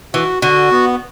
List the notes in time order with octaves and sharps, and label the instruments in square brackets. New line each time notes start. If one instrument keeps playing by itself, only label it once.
[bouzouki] E3 [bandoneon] F#4
[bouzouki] D3 [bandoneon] F#4
[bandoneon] B3